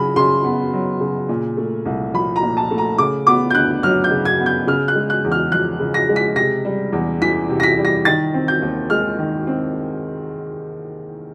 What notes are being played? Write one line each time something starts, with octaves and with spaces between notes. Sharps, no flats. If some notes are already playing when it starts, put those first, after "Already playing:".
Already playing: C#3 F#3 B5
C#3 C6
B3
F#3
C#3
A#2
A3
C2
F3 B5
A#5
A#2
A5
A3
A#5
C#3 D6
B3 D6
G6
D2 F#6
F#3 F6
G6
C#3
G#6
B3
G6
C#3 F6
F#6
G#3
F#6
E2
F6
F3 F#6
C#3
A#6
G#3
B6
C3 A#6
G3
E2
E3 B6
C3
A#6
B6
G3
A#6
D#3 A6
C4
G6
D#2
G#3 F6
D#3
C4